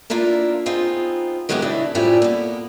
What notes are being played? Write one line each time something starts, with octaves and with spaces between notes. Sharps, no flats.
A#3 D4 E4 F4 A#4
B3 C4 D#4 F4 G#4
D#3 F#3 G#3 B3 E4 G4
C#3 E3 D4 E4
F#2 A2 F3 G3 E5 G#5
A#3 B3